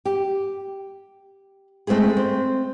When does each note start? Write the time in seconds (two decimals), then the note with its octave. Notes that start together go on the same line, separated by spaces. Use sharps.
0.05 G4
1.87 G#3 A3 C4 E4 G#4
2.17 C4